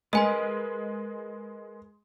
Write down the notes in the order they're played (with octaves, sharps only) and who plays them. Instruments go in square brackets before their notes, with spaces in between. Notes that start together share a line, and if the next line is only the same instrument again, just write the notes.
[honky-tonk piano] G#3 [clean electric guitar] A#4 B4 [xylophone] D#5 G#5 C6